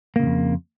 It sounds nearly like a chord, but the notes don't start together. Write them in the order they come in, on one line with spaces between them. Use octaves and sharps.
A#3 C#3 G#2 F2